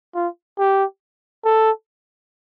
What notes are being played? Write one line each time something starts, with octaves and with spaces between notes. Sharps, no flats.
F4
G4
A4